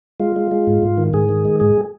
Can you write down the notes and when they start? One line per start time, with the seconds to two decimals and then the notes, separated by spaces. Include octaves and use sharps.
0.20 G#3 F4
0.36 G#3
0.51 G#3
0.67 G#2
0.83 G#2
0.98 D#3
1.13 G#2 G#4
1.29 D#3
1.45 G#3
1.60 G#2 G#4